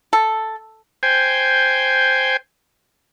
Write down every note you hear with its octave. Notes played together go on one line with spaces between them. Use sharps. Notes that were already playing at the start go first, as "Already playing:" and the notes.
A4
C5 G5 G#5